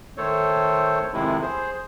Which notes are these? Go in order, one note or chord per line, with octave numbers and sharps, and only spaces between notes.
D#3 A3 A4 C5 C#5
F2 A2 C3 D#3 G#3 E4
G#4 C5